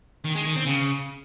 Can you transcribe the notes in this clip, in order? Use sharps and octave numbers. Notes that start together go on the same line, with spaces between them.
D#3
G#3
D#3
C4
C#3